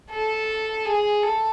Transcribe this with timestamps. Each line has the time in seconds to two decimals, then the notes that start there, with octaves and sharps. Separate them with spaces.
0.10 A4
0.85 G#4
1.23 A4